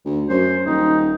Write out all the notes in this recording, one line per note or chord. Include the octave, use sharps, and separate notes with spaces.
D2
F#2 C5
D#1 D#4